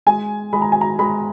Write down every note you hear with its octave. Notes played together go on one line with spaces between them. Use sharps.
G#3 G#5
G#3 B5
A#5
G#5
A#5
G#3 B5